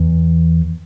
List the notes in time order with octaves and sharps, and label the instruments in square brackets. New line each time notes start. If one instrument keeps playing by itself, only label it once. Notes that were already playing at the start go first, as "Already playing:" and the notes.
Already playing: [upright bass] E2